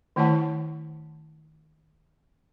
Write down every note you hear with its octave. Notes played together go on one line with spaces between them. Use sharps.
D#3 A3 E4 C#5 F#5 A5